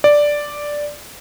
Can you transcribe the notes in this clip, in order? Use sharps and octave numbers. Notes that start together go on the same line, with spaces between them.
D5